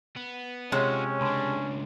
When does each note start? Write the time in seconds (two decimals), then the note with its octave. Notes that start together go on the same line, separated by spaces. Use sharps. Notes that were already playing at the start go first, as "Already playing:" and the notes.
0.16 B3
0.72 C3 G#3 C#4 F4 C#5 F#5
1.21 C#2 D4 A5 B5 C6